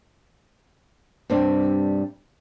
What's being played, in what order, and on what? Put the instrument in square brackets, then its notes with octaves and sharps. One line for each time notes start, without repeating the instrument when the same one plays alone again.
[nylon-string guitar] G2 C3 G3 C4 D4